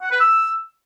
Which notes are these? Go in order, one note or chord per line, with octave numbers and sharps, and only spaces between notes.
F#5
B4
E6